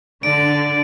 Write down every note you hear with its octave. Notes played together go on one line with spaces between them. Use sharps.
D3 D5 D7